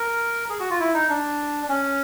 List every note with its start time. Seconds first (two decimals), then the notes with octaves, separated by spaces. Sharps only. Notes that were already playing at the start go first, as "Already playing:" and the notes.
Already playing: A#4
0.50 G#4
0.60 F#4
0.70 F4
0.80 E4
0.94 D#4
1.09 D4
1.69 C#4